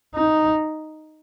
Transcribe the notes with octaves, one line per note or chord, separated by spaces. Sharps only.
D#4